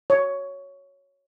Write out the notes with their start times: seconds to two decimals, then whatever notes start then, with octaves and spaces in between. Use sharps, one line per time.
0.10 C#5